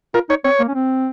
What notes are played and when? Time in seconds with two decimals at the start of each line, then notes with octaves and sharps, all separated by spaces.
0.14 F4 A#4
0.29 D#4 C#5
0.44 C4 C#5
0.60 A#3
0.68 C#4
0.74 C4